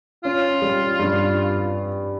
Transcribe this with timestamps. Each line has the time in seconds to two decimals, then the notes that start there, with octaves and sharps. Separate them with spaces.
0.24 C#4 F4
0.62 G3
0.99 G2